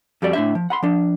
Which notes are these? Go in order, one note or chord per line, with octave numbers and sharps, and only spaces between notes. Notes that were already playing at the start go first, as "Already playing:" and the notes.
F2 G3 F#4 D5
A2 D4 E5
F3
F#5 B5 C6
F3 D4